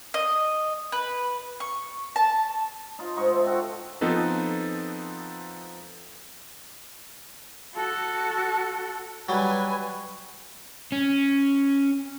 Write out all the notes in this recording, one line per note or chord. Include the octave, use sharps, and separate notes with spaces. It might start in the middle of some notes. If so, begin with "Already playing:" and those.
D#5
B4
C#6
A5
D#4 F4
G#2 D#4 C5 C#6
A4 E5
F4 F#4 A4 G5
F3 B3 C4 D#4 A4 B4
F#4 A4
F#3 G3 B4 G#5
C#4